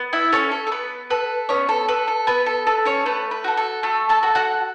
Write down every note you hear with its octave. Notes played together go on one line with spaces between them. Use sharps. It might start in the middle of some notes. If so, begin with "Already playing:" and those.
Already playing: B3
E4 E5
C#4 A4 C#5
A4
A4
B3 B4
A4 B4
B3 C#4 C#5
A4
A4 B4
A4
B3 B4
A4
A4 B4
C#4 C#5
A3 B4
B4
F#4 A4
A4
A3 A4
A4 A5
F#4 A4
F#4 F#5